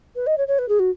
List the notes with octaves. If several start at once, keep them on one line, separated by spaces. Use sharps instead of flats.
B4
D#5
C#5
C#5
B4
G#4
F#4